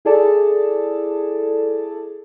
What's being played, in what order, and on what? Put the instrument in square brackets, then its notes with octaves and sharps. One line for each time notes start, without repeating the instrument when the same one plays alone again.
[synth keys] E4 G#4 A4 D5 A5